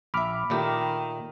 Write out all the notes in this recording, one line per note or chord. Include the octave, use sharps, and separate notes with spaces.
A#1 E5 B5 D6 F6
A#2 D#3 A3 G4